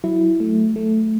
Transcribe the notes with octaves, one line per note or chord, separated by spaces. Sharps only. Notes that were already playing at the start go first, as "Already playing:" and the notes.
F#3 E4
A3
A3